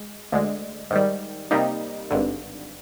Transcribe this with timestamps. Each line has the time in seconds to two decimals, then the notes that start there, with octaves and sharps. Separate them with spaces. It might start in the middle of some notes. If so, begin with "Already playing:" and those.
Already playing: G#3
0.32 D2 D3 G#3
0.91 G#2 D#3 G3
1.51 C3 G3 A#3 D#4
2.11 G#1 G2 D3